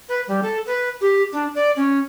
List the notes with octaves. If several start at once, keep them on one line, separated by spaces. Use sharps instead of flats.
B4
G3
A4
B4
G4
D4
D5
C#4